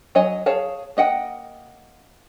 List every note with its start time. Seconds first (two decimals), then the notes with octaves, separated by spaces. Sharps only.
0.15 F#3 C#5 D#5 G#5
0.46 G#4 C#5 F5 A5
0.97 A#3 D#5 F#5 G5